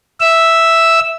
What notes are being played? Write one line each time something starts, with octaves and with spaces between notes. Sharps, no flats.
E5 E6